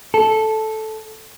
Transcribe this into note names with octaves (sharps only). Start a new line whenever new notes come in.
A4